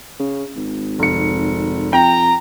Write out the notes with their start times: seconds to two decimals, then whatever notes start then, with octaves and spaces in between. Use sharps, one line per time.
0.19 C#3
0.56 G#1
0.99 F1 C#7
1.93 F2 G5 A#5